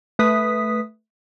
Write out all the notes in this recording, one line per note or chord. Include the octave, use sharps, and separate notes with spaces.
A3 B4 D#6 B6